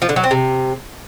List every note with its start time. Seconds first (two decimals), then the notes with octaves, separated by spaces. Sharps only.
0.02 F3
0.09 D3
0.16 F#3
0.24 C4
0.31 C3